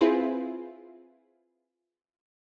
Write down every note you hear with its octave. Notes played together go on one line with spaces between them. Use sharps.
C4 E4 F4 G#4 B4 C5